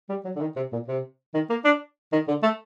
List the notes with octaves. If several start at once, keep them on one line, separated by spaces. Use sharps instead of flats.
G3
F#3
D3
D#3
C3
A#2
C3
D#3
A#3
D4
D#3
D3
A3